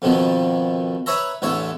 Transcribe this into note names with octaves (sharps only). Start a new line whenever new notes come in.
F2 B2 D#3 F3
B4 C#5 E5 A#5
A1 E2 D3 C#5 E5